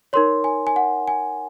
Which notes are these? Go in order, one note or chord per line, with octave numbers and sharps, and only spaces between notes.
D#4 A#4 C#5 C6
G#5
G#5
F#5
G#5